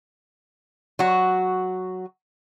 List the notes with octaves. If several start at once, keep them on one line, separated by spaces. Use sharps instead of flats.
F#3 F#4